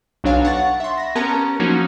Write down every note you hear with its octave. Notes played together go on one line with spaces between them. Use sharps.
B1 F#3 D4 C#5 F5 G#5
F#5 C#6 A6
E5 C6
B5 A#6
B3 C#4 G4 A#4 A5 A#5
F3 F#3 A#3 C#4 D#4 F#4